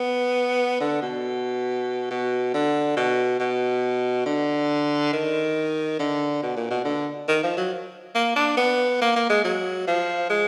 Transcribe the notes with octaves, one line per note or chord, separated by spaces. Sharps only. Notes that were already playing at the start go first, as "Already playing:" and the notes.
Already playing: B3
D3
B2
B2
D3
B2
B2
D3
D#3
D3
B2
A#2
B2
D3
D#3
F3
F#3
A#3
D4
B3
A#3
A#3
G#3
F#3
F3
G#3